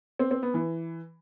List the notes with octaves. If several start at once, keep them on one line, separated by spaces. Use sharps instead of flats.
C4
C4
B3
E3